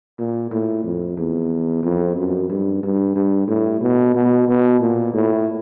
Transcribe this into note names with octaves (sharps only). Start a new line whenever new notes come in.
A#2
A2
F2
E2
F2
F#2
G2
G2
G2
A2
B2
B2
B2
A#2
A2